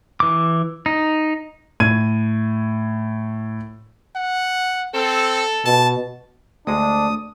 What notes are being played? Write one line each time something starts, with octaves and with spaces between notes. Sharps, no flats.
E3 D6
D#4
A2 G#6 D#7
F#5
C4 A4
B2 A5
D2 G#3 A3 D4 D#6